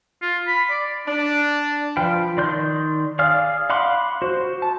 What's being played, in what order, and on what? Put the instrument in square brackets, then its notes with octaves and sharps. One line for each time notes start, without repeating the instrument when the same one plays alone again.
[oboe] F4
B5
D5
[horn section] D4
[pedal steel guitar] F3 F4 B4 G5
D#3 D5 C6 G6
G#4 D5 F5 F6
F5 F#5 B5 C6 D6
F#4 C5
A5